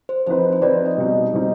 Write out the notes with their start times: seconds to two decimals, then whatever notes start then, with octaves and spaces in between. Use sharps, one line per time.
0.09 C5
0.27 F3 C4 D#4 B4 C5
0.52 C5
0.62 F3 C4 D#4 B4 D5
0.86 D#5
0.98 B2 G3 C4 D#4
1.34 B2 G3 C4 D#4